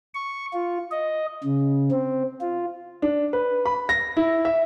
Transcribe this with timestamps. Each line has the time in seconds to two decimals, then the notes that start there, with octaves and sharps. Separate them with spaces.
0.14 C#6
0.53 F4
0.91 D#5
1.44 C#3
1.91 C4
2.41 F4
3.02 D4
3.33 B4
3.66 B5
3.89 A#6
4.17 E4
4.45 E5